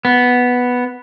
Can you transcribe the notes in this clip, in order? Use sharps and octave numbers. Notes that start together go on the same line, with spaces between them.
B3